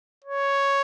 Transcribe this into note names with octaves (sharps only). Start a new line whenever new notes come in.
C#5